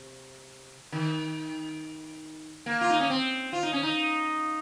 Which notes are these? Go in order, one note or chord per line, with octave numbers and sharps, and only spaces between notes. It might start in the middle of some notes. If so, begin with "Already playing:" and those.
Already playing: C3
D#3
A#3
F4
D#4
C#4
C4
F4
D#4
C#4
D#4